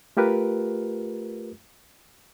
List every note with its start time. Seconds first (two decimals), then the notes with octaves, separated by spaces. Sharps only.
0.17 A3 F4 G4 A#4 B4